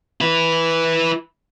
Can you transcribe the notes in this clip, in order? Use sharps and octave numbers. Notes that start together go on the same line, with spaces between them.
E4 B4